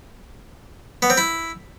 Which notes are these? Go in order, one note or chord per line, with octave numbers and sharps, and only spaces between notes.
B3
C4
E4